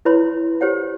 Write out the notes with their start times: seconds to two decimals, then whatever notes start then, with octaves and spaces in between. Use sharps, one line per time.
0.05 E4 B4 C#5 B5 C6
0.61 G4 C5 C#5 F#5